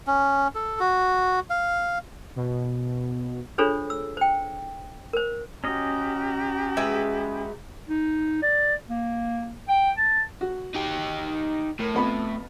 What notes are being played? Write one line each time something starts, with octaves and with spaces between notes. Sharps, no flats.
C#4
A4
F#4
F5
B2
D4 F4 G#4 A4 C5 C#5
E6
C5 G5
A#4 C5
C#4 F#4 G4 D#5 A#5
G#3 B4 E5
D#4
D5
A#3
G5
A5
F#4
D#4 G4
A2 A#4
F2 B3 B5